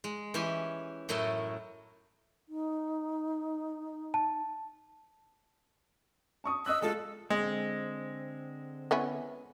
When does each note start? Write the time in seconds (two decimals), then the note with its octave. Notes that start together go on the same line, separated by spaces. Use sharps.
0.04 G#3
0.34 E3 C#4 G4 G#5
1.09 F#2 A2 F#3 A3 E4 D#5
2.49 D#4
4.14 A5
6.44 A5 C#6 D#6
6.66 D#5 D#6 E6 F#6
6.82 G#3 F4 A4
7.30 D3 G#3 C4
8.91 B3 C#4 E4